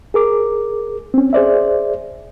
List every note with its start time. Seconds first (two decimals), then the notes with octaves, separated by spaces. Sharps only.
0.14 G#4 A#4 D6
1.14 C4 C#4
1.33 G#4 C5 D5 E5